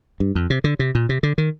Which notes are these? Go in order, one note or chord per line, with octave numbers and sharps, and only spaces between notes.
G2
F2
C3
D3
C3
A#2
C3
D3
D#3